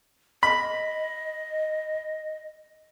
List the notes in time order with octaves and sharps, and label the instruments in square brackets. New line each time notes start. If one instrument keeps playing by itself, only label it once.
[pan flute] D#5 [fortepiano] B5